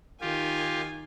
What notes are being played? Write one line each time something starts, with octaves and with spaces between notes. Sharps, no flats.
D#3 F4 G4 G#5